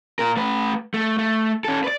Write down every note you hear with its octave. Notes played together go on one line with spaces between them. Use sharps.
A#2 A#4
A3 B4
A3
A3
C#4 A4
B4 D5